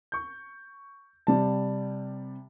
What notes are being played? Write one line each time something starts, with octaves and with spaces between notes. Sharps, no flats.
C#6 G6
C3 G3 A5